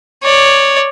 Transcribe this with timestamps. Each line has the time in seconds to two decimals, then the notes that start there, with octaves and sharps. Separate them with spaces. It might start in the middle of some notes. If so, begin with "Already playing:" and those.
0.23 C#5 D5